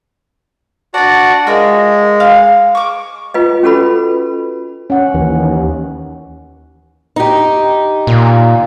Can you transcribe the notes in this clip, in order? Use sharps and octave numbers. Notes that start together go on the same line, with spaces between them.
D4 F#4 D5 F#5 A5
G#3 F4 A#4 C#5
F5
C#6 D6
F4 B4 D#5
C#4 F#4 A4 B4 B5
C#4 F#5
D#2 E3
D#4 G4
A#2